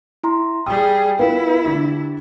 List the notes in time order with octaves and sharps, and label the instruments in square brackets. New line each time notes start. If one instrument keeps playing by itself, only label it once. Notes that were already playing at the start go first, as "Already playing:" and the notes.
[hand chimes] E4 A#5 C6
[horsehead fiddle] G3 G#4 [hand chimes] G5 [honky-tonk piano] D#6
[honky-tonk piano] B3 [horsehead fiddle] E4 [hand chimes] F4 A#4 F5
[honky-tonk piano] D3 D4 G#6 [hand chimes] G4